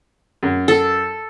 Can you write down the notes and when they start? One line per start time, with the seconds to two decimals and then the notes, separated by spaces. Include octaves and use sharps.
0.43 F#2
0.68 A4